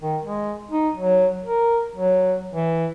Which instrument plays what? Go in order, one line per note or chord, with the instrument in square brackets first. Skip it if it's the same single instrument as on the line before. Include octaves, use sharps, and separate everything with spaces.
[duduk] D#3
G#3
D#4
F#3
A#4
F#3
E3